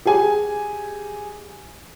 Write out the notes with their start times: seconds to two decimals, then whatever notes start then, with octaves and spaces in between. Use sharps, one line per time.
0.05 G4 G#4 G#5